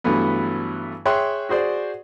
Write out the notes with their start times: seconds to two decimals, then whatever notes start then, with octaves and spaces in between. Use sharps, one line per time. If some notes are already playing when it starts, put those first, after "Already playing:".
0.04 G2 E3 F#3 A3 B3
1.05 G#4 C#5 E5 G5 C6 F#6
1.49 F#4 G#4 C5 D5